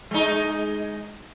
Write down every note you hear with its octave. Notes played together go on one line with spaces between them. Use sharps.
G#3 D#4